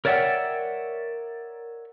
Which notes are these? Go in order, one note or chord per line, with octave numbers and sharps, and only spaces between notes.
A#4 C#5 D5 E5 F#5 G5